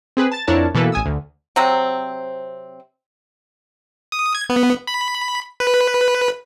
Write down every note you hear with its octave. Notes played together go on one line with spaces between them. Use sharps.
C4 G#4 B4
A5 A6
F2 D4 E4 A#4 C#5 A5
B2 E3 A#3 A4 B4
A1 G#5 D#6 E6
D2
C3 F#3 C4
D#6
G#6
B3
B5
B4